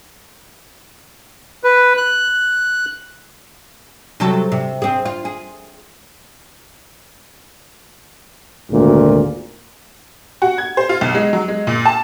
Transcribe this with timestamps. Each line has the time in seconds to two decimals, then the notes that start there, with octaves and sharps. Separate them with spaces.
1.64 B4
1.97 F#6
4.20 C3 F#3 A4
4.52 C3
4.82 C4 G#4
5.05 F4
5.25 G#4
8.69 G#1 D2 A#2
10.42 F#4
10.58 G#6
10.77 C5
10.89 F4
11.01 B1
11.15 G#3
11.33 F#3
11.48 G#3
11.67 A#2
11.85 A5